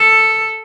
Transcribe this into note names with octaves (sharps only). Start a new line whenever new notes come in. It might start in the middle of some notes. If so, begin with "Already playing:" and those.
Already playing: A4